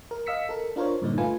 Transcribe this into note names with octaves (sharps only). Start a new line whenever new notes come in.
A#4
D#5 F5 E6 B6 C#7
A4 A#4
D4 F4 A#4 C5 C#5
G2 A#2 D3 D#4
A3 F4 B4 G#5